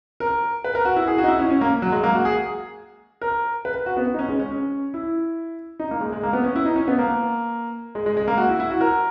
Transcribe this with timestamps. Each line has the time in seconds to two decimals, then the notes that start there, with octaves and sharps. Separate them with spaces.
0.20 A#4
0.64 B4
0.75 A#4
0.85 F#4
0.96 E4
1.07 G#4
1.18 F#4
1.24 D#4
1.28 E4
1.39 C#4
1.50 C#4
1.61 A#3
1.82 F#3
1.92 G#3
2.03 A#3
2.14 F#4
2.25 G#4
3.21 A#4
3.65 B4
3.86 F#4
3.97 B3
4.14 D#4
4.19 C#4
4.29 G#3
4.39 C#4
4.51 C#4
4.94 E4
5.80 D#4
5.91 A#3
6.01 G#3
6.13 G#3
6.23 A#3
6.33 B3
6.44 C#4
6.56 E4
6.65 D#4
6.76 C#4
6.88 B3
6.99 A#3
7.95 G#3
8.06 G#3
8.17 G#3
8.28 A#3
8.38 F#4
8.49 E4
8.60 E4
8.71 F#4
8.81 A#4